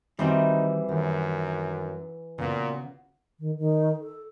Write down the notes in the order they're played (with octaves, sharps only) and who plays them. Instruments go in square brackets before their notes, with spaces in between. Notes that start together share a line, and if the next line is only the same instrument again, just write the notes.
[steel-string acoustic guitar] D#3 [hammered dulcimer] E3 [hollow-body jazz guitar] G3 C4 F#4 [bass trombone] D#4
[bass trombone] F#2 [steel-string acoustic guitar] D#3
[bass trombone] A#2 [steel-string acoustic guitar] C#3 B3 F#4
[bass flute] D#3
D#3
A4